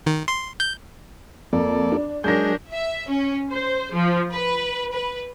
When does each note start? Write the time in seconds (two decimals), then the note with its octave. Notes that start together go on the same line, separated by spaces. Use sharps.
0.06 D#3
0.28 C6
0.60 G6
1.53 F2 A#3 A4 D5
1.92 D4
2.24 F#3 G#3 D4 G#4 A#4 G6 A#6
2.71 E5
3.08 C#4
3.51 C5
3.94 F3
4.31 B4
4.93 B4